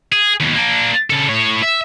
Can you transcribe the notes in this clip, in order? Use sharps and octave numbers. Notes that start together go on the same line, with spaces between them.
G#4
D#2 B2
A#3 D4
C#3 A4
A2 C#5
E5